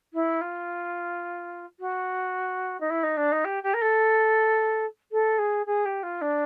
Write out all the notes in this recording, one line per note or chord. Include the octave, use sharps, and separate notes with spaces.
E4
F4
F#4
D#4
E4
D#4
D4
D#4
G4
G4
A#4
A4
A4
G#4
G#4
G4
F4
D4